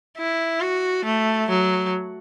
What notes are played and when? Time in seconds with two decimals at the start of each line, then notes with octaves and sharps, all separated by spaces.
0.18 E4
0.61 F#4
1.05 A3
1.49 F#3